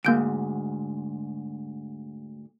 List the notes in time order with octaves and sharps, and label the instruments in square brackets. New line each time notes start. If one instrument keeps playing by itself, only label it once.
[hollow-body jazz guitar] D2 G#2 [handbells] A#3 G6 D7